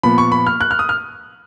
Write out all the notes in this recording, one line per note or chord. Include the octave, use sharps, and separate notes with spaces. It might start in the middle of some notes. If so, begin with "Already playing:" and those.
A#2 F3 B3 B5
C#6
B5
F6
F#6
F6
D#6
F6